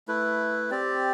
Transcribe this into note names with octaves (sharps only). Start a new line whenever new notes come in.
A3 E4 B4
C4 G4 D5